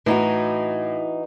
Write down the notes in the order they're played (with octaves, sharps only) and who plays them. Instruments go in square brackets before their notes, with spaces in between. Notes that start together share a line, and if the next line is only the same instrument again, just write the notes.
[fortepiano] A2 [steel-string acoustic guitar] E3 D#4 F#4